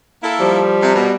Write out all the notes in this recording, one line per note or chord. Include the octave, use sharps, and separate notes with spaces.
A#3 E4 A4
F3 G3
C3
B2